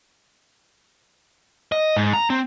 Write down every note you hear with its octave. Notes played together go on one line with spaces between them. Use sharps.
D#5
G#2
A#5
C4